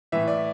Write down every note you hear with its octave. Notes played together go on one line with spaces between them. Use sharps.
A2 E3 E5
D5